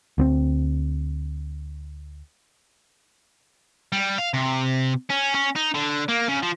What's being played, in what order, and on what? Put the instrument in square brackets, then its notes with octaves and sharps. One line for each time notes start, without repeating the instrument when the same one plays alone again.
[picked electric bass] D2 B3 C4
[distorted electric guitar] G3
F5
C3
C#4
C#4
D#4
D3
A#3
C#3
F3